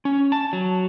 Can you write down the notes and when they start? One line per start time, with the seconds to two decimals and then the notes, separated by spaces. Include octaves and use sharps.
0.05 C#4
0.32 A5
0.53 F#3